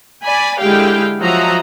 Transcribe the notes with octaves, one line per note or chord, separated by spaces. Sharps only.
D5 G#5 B5
D3 G#3 E4 G4 F5 G5
F3 F#3 F#4 D#5 E5 A#5